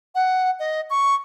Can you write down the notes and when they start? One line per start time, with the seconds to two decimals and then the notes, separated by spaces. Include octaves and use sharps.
0.15 F#5
0.59 D#5
0.90 C#6